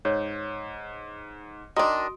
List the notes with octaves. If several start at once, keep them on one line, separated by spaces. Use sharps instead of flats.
G#2 C#5
D#3 D4 F#4 D#5 C6 D#6